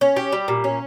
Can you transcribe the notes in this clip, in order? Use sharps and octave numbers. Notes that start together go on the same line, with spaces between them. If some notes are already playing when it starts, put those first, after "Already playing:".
C#4
G4
G3
A#2
C#4